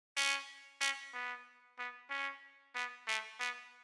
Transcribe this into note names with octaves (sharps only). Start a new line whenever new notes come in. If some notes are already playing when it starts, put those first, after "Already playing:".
C#4
C#4
B3
B3
C#4
B3
A3
B3